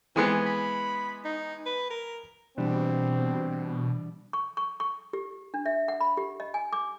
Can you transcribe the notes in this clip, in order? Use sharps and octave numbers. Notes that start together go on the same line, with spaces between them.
E3 G#3 B3 C4
B5
D#4
B4
A#4
B2 E3 G3 C4 D4
C#6
C#6
C#6
G4
D4
E5
F#5
B5
G4
D#5
G#5
D6